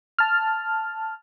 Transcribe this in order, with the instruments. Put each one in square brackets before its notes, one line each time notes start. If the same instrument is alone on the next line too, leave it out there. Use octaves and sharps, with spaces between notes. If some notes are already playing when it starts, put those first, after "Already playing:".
[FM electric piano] A5 F6